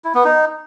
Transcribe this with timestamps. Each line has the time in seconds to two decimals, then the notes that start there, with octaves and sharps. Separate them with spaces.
0.04 E4
0.14 B3
0.25 D#4